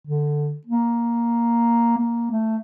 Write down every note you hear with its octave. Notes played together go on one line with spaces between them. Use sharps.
D3
A#3
A#3
A3